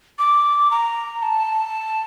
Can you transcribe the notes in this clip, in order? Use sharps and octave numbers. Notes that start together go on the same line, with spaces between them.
D6
A#5
A5